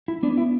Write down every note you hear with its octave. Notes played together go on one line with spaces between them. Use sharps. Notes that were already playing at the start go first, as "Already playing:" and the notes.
E4
B3 D4
E4